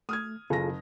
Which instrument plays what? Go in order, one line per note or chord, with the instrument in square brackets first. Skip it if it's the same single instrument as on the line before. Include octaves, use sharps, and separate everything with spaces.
[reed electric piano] A3 [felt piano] D#6 F6 G#6
[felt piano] F#1 A#6 [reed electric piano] F4 G#4 A4